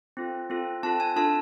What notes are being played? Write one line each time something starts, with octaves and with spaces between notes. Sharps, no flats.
C4 F4 A4
C4 F4 A4
C4 F4 A4 A5
G#5
D4 F4 A4 A5